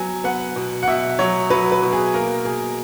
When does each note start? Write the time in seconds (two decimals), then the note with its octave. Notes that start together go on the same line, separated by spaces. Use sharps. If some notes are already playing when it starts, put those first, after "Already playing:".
Already playing: F#3 B3 G#5
0.24 B3 F#5
0.56 B2
0.83 F#5
0.88 B2 E5
1.19 F#3 C#5
1.50 F#3 B4
1.72 B4
1.82 B2
1.93 G#4
2.14 A#3 A#4
2.45 B2 G#4